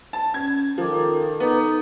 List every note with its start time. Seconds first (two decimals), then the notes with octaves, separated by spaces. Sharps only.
0.13 A5
0.34 C#4 G#6
0.78 D#3 F3 A4 A#5 D6
1.40 B3 D#4